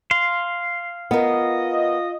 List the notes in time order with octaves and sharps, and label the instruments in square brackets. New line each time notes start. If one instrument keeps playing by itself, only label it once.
[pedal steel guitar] F5 C6
[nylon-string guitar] B3 A#4 [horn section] F4 D#5